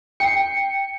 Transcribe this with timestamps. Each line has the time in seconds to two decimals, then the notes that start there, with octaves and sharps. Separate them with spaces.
0.20 G5 C7 C#7